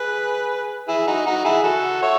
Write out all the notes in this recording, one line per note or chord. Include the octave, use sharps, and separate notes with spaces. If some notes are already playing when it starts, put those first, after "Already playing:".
Already playing: G#4 B4
E4 G#4
D#4 F#4
D#4 F#4
E4 G#4
F#4 A4
C#5 E5